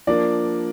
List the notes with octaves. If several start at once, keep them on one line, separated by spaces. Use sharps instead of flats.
F3 A#3 D4 D5